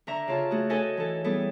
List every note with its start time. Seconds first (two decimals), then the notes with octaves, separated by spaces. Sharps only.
0.07 D3 E5 A#5 C#6
0.28 C#3 F4 A5
0.51 A3 F#4 G#4
0.69 D#4 A4 B4 C#5 D#5 G#5
0.97 E3 A4
1.24 G3 B3 E4 G#4 A4